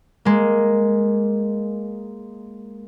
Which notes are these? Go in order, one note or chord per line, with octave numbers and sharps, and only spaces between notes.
G#3 A#3